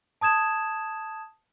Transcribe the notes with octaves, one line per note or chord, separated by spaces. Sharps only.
A5 D#6 G#6 E7